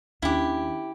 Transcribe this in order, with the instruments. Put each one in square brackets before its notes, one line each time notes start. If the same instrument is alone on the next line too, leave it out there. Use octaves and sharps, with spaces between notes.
[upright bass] D#2 [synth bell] C#4 D4 [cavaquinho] E4 G4